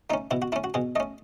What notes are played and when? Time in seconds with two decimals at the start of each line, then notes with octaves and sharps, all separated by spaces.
0.10 A3 D#4
0.14 C#4
0.31 B2 E4
0.42 F#4
0.52 A3 C#4 E4
0.64 F#4
0.74 B2 G#4
0.96 A3 C#4 D#5